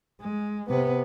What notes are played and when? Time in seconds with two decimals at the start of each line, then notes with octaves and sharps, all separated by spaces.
0.21 G#3
0.68 C3 B3